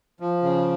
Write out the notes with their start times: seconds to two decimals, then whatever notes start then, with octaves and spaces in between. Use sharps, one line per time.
0.20 F3
0.42 C#3